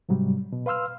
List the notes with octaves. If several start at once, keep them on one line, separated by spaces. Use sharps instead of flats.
G#2 C3 F#3 G3
B2
B4 F5 C6 E6 F6